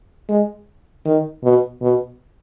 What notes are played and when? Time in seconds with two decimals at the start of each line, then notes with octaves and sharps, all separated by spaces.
0.29 G#3
1.06 D#3
1.44 B2
1.82 B2